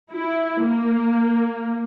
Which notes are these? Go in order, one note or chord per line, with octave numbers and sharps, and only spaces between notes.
E4
A#3